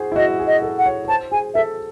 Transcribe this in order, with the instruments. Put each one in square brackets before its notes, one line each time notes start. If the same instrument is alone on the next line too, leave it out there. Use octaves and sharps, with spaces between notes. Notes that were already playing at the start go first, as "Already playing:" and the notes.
Already playing: [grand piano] E4 F#4 G#4 C5
E4
[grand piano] F#4 [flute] D#5
[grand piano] G#4
[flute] D#5
[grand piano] A4
[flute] F#5
[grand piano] C#5
C#5
[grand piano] C5 [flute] A5
[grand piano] G#4 [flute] G#5
[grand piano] A4 [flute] E5